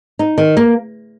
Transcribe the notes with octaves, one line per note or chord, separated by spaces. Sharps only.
D#4
D#3
A#3